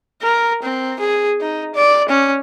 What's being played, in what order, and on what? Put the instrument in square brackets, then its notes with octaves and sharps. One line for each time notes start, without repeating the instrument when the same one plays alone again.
[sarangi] A#4
C4
G#4
D#4
D5
C#4